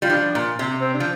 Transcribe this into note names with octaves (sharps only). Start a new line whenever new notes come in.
G3 F4
F3 D4
A#2
C3
C4
D4
F3